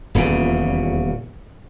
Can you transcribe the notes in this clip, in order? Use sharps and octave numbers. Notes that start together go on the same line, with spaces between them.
D#1 E2 A#2 C#3